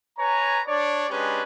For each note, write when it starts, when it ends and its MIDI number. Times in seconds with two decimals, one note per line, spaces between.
0.18 0.61 71
0.18 0.61 73
0.18 0.61 80
0.18 0.61 82
0.66 1.05 62
0.66 1.05 73
0.66 1.05 74
1.09 1.42 56
1.09 1.42 61
1.09 1.42 62
1.09 1.42 67
1.09 1.42 71